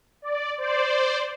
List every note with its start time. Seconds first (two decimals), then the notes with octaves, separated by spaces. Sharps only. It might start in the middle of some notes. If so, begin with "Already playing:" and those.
0.22 D5
0.58 C5 D5